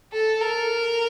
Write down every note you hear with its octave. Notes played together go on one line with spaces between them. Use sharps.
A4
A#4